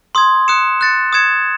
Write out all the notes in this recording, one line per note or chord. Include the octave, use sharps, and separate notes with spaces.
C6 D#6 G#6
D#6 F#6 C#7 E7
D#6 F#6 A6 C#7
D#6 G#6 C#7 E7